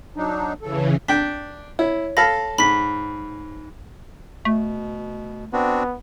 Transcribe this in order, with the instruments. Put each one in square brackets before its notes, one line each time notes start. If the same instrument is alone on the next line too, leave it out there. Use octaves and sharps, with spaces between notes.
[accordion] F#3 D4 D#4
[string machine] C#3 E3 [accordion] A4
[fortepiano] D4 G5 [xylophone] B6
[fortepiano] E4 [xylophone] C#5
[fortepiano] A4 F5 B5 [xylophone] A#6
[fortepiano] G#2 [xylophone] B5 B6
[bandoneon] B2 [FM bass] A3
[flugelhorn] B3 [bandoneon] C4 D4 F#4